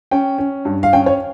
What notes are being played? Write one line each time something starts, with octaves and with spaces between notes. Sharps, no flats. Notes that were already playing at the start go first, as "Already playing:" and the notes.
C#4 G5
C#4
G2
F5
C#4 G5
C#5